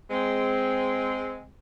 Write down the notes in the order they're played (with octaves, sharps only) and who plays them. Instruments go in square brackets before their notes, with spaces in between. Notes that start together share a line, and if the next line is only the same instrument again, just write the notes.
[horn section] G#3 C4